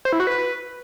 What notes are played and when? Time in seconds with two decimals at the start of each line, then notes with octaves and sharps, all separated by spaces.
0.05 C5
0.12 E4
0.20 F#4
0.27 B4